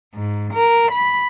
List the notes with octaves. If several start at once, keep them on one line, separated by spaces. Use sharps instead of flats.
G#2
A#4
B5